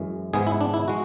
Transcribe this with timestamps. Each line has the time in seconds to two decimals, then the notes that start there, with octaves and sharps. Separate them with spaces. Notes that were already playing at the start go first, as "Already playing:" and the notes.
Already playing: F#2 E3 G#3
0.33 G#2 G#3 B3 G#4
0.47 E4
0.61 D4
0.74 E4
0.88 G#3 F#4